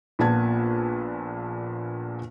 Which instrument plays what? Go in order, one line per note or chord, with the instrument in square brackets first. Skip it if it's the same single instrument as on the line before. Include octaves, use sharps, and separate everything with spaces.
[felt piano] A#1 A#2 B3 B4 A5 G#6